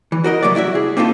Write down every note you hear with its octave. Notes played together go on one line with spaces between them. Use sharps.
E3
F#4 A#4 D#5
C3 F#3 A3 D5
C2 E4 F#4 E5
G#4
A#3 C4 D#4 F4 A4